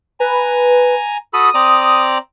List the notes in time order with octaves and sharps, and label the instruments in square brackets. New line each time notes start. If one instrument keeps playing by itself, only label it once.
[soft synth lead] B4 [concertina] G#5 A#5
[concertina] F#4 A4 B5 [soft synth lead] D#6
[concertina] C4 D5 A#5